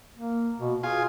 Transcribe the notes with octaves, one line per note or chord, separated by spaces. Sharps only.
A#3
B2
F4 G#4 G#5